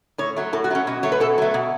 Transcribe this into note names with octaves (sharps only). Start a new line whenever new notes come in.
A2 C#5
F#3 A3
A2 A4
F#4
F#3 A3 C#4
B2 F#4
F#3 A3 C#5
B4
B2 A4
F#3 A3
B2